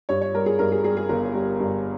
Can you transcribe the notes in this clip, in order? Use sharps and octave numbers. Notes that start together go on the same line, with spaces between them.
G2 C#5
C#5
G3 A#4
G#4
G2 A#4
G#4
G3 G#4
G#4
G1 A#4
G3
G2